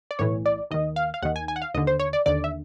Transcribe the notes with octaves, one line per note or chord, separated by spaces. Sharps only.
D5
B1 A2 E3 C#5
D5
D#2 D#3 D#5
F5
F5
D#2 D#3 F#5
G#5
G#5
F#5
F5
D#2 D3 D#5
C5
C#5
D5
D#2 D3 D5
E5